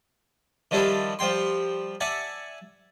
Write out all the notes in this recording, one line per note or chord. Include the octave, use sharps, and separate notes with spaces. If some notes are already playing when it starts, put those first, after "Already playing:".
D#3 F3 G3 D4 E4 A4
F3 G3 G5 C6
D5 E5 F#5 G#5 A5